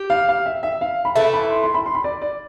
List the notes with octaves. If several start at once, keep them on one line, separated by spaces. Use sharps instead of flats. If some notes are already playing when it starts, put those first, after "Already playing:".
Already playing: G4
F5
F5
E5
E5
F5
B5
E3 A3 E4 A5
B5
C6
C6
B5
C6
B5
D5
D5